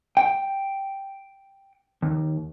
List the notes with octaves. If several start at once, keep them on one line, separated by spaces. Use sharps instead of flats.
G5
D#2